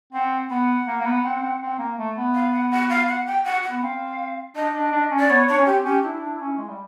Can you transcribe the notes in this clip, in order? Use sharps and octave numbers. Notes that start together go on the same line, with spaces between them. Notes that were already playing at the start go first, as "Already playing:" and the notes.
C4 F#5
B3 F#5
A#3
A#3
B3
C4
C4
C4
A#3
A3
B3
F5
F#5
F#5
F5
F#5
G5
F#5
F#5
B3
C4 F5
D4 D#5
D4
D4
C#4
D5
B3 C#5
D4 C#5
C#4
C4 G4
C#4 G4
D4 E4
D4
C#4
G#3
G3